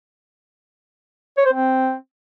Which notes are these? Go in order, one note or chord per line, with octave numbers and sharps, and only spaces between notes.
C#5
C5
C4